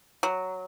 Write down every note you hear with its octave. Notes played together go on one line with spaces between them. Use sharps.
F#3